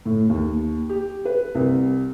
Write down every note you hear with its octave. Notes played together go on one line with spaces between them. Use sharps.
A2
D#2
G4
B4
C2